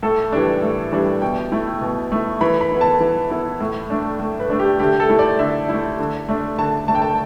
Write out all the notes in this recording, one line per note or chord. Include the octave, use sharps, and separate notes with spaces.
A2 A4
E3 G3 D4
A2
E3 G3 D4
B2 G5
A3 E4
B2
A3 E4
E3 B5
B5
B3 E4
A5
E3
B3 E4
A2
A3 D4
A2
B4
A3 D4
G4
D3 G4
A4
A3 E4
D5
D3 E5
A3 E4
D3
A3 D4
D3 A5
A3 D4 A5
G5
A5